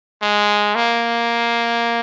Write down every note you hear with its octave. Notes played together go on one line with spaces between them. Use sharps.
G#3
A#3